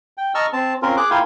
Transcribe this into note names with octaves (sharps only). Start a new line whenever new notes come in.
G5
D#5 A5 A#5 C#6 E6 F6
C4 A5
C4 C#4 F4 A#4
G#4 D6 F#6
A#3 E4 F4 F5 G5 G#5